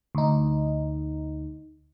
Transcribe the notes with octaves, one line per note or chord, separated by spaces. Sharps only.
D2 D#4